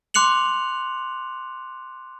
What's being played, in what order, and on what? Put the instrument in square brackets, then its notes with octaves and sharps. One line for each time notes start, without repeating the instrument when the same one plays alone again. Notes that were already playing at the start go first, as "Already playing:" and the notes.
[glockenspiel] C6 D6 F#6 C#7 F7 F#7